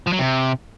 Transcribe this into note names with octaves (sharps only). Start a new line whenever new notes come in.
F3
F#3
C3